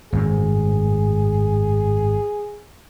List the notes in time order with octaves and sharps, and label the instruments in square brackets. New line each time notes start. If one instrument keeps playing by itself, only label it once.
[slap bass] G#1 F#2 A2 [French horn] G#4